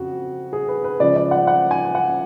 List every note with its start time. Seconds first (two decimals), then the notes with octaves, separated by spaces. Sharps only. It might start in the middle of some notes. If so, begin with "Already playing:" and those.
Already playing: F2 C#3 F#4
0.53 G#4
0.68 B4
0.84 B4
1.00 C#2 C#3 F3 D5
1.16 D5
1.31 F#5
1.47 F#5
1.71 G#5
1.95 F#5